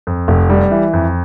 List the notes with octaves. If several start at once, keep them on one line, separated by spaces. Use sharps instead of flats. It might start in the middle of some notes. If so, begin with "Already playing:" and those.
F2
F1
G3
E3
F2